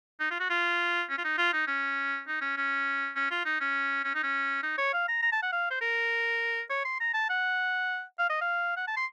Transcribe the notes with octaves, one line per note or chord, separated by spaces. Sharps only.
D#4
F4
F#4
F4
C#4
F4
D#4
F4
D#4
C#4
D#4
C#4
C#4
C#4
F4
D#4
C#4
C#4
D#4
C#4
D#4
C#5
F5
A#5
A#5
A5
F#5
F5
C5
A#4
C#5
C6
A#5
A5
F#5
F5
D#5
F5
F#5
A5
C6